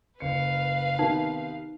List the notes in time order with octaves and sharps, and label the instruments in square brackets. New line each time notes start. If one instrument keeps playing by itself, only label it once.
[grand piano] F#1 C#7 [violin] B4 F5
[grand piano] C3 D#3 B3 [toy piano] D#4